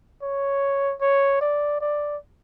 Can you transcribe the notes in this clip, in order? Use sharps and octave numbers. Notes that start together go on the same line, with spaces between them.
C#5
C#5
D5
D5